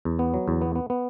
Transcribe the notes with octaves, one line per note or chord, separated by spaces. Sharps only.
E2
B3
F#3
E2
B3
B3
B3